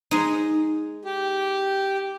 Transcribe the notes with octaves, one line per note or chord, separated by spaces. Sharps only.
G#3 D#4
G4